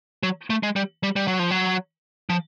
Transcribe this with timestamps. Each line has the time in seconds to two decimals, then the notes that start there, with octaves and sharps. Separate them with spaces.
0.23 F#3
0.50 A3
0.63 G#3
0.76 G3
1.03 G3
1.16 G3
1.28 F#3
1.39 F3
1.51 F#3
2.29 F3